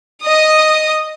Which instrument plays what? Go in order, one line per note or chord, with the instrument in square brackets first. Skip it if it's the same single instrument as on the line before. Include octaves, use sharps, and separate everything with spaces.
[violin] D#5 D#6